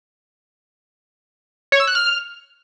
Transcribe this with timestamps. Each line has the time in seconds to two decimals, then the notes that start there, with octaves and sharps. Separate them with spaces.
1.72 C#5
1.80 E6
1.87 F#6
1.95 F6